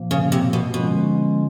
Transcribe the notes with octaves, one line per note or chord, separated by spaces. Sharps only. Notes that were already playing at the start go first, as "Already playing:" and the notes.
Already playing: A#2 F3 A#3
C#3
C3
B2
B2 D3 F3 G#3 C#4 F4